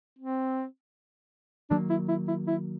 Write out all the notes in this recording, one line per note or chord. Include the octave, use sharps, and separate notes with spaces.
C4
D#3 F#3 A#3 D4
E4
E4
E4
E4